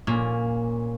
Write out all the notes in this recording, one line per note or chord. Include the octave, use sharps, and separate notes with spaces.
A#2 A#3 C#4